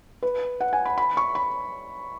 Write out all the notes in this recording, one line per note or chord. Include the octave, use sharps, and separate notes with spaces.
B4
F#5
G#5
B5
B5
C#6
B5